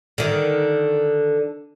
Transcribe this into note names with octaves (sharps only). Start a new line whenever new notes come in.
D3 D#3